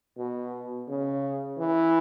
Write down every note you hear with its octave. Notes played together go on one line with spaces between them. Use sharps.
B2
C#3
E3